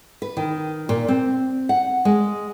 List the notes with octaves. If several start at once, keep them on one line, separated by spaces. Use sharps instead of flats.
B4
D#3
A#2
C4
F#5
G#3